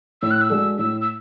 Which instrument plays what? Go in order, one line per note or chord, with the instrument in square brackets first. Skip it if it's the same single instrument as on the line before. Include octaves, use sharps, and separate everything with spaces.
[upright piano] A2 [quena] E6
[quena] F#6
E6
[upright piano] G#3 D4 F#4 A4
[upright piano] A2 [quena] E6
[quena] E6